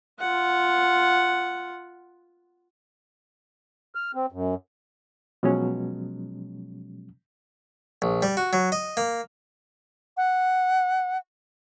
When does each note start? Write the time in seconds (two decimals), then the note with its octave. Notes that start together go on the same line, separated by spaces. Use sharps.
0.20 F4 F#5
3.95 F6
4.15 C4
4.32 F#2
5.43 B2 F3 F#3 G#3 C#4
8.02 A#1
8.22 G3
8.37 F#4
8.53 F#3
8.72 D#5
8.97 A#3
10.17 F#5